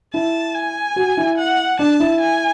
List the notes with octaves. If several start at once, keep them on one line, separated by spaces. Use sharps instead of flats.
E4 A5
G#5
F#4
E4
F#5
D4 A5
E4
G#5